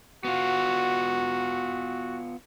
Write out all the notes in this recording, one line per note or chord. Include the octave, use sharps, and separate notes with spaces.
B3 F4 F#4